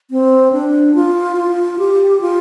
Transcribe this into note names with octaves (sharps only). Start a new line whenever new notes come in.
C4
D4
F4
F4
G4
F4